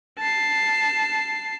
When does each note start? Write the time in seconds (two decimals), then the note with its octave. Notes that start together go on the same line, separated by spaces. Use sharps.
0.19 A5 C7